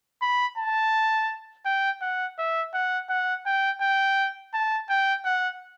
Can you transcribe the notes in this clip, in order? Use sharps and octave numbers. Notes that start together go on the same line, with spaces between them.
B5
A5
G5
F#5
E5
F#5
F#5
G5
G5
A5
G5
F#5